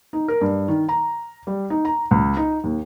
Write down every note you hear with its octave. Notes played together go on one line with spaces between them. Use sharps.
D#4
A#4
G2
D#3
A#5
G3
D#4
A#5
C#2
D#4
D#2